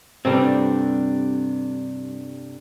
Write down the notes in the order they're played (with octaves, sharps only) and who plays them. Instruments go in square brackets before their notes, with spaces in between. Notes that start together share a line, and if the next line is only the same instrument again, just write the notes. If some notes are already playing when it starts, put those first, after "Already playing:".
[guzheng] G2 A3 F#4 [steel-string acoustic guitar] C3 D4 [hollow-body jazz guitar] G3 C4